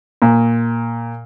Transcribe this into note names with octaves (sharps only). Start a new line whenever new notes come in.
A#2